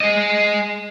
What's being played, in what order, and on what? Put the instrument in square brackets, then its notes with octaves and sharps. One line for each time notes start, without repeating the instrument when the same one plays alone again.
[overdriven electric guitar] G#4 D#5